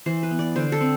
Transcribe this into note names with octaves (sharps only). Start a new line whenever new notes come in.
E3 C5
B4
B3
D5
D3 C5
A4
C4